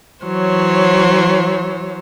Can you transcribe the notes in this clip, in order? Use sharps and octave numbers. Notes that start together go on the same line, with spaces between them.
E3 F#3 C5 C#5